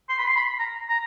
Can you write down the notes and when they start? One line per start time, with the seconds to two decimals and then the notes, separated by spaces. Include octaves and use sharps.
0.09 C6
0.19 B5
0.28 C6
0.36 B5
0.59 A#5
0.89 A#5